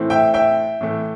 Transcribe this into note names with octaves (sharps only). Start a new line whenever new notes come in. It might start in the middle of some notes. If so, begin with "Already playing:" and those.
Already playing: A2 E3 A3 C4 E4
E5 G5
E5 G5
A2 E3 A3